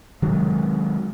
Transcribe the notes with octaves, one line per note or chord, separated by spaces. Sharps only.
C3 D#3 F#3 G#3